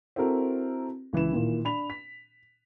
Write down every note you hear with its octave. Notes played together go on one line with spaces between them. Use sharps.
C4 E4 F#4 A4 A#4
C#2 E3 E4 E7
A#2 D#3 E3
D4 B5 F7
B6